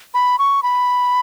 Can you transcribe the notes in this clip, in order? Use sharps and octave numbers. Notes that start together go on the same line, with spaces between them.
B5
C#6
B5